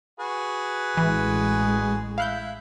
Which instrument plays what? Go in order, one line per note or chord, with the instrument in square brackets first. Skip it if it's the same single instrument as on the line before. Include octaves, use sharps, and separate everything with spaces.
[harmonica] F#4 G#4 B4
[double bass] A1 G#3 [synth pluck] E3
[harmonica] E4 [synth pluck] F5 F#6 G6